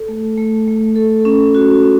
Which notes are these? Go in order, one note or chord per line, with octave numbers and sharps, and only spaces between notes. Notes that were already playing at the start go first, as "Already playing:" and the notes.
Already playing: A4
A3
A3
A3
A4
C#4
F#4
C#4